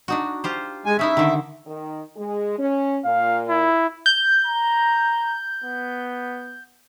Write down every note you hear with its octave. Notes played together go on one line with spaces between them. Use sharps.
D4 D#4 F#4
F4 G4 C5
G#3 G#5
C#4 D#4 E4 E5
D3 D#3
D#3
G#3
C#4
A#2 F5
E4
G6
A#5
B3